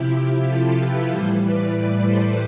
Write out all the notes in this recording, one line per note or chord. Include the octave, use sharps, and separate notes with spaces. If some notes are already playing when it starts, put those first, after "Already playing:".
Already playing: C3 F3 E4 G4
F4 A4
G4 B4
A2 E3 G3 A4 C5
B4 D5
A4 C5